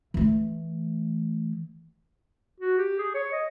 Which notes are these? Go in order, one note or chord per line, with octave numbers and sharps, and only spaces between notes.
E3 A3
F#4
G4
G#4
C#5
D#5